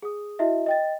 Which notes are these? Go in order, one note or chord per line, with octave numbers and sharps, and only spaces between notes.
G#4 D#6
E4 F#4 D#5 E5
D#5 G5 A6